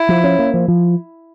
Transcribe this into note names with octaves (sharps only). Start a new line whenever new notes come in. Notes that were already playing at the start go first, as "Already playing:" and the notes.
Already playing: E4
F3
C#4
A#3
F3
F3